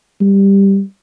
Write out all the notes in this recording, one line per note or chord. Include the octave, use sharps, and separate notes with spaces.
G3